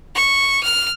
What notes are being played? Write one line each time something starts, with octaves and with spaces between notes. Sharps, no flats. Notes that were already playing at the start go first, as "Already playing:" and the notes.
C#6
F6